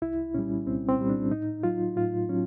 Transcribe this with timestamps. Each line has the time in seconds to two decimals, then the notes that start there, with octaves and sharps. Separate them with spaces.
0.02 C2 E4
0.34 A#2 G3 C#4
0.66 C2 C4
0.89 C4
0.99 A#2 G3
1.09 D4
1.31 A2 D#4
1.63 F#3 F4
1.97 A2 F4
2.29 F#3 C#4